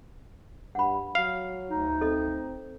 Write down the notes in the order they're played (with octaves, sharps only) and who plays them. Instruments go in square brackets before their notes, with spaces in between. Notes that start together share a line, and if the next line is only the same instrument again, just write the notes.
[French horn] G2 [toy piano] F#5 B5
[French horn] F#3 [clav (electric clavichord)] F5
[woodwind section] D2 D#4
[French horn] C4 [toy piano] A4 D#5